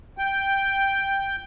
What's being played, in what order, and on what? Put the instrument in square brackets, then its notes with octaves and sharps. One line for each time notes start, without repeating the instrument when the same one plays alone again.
[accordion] G5